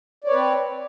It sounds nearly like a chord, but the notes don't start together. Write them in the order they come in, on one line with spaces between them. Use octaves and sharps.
D5 C#5 B4 C4